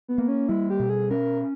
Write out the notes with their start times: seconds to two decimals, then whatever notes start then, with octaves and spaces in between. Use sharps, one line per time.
0.08 B3
0.18 A#3
0.28 C#4
0.48 G3 E4
0.70 G4
0.80 B2
0.90 G#4
1.10 C#4 A#4